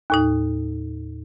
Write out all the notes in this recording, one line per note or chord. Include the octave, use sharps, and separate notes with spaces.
D#2 A2 D#4